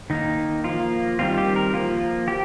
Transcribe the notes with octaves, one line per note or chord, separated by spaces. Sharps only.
D#3 A#3 D#4
F3 A#3 F4
D#3 G3 C4 F4
G4
A#4
F3 A#3 F4
F3 G4